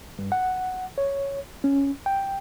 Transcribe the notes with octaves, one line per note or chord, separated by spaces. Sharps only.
G2
F#5
C#5
C#4
G5